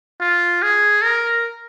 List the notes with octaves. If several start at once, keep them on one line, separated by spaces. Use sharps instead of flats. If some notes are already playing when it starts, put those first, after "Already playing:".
F4
G#4
A#4